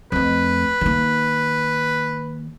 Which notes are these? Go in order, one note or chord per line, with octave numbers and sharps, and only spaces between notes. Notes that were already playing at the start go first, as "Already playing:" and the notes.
F2 A3 B4
D#3 A#3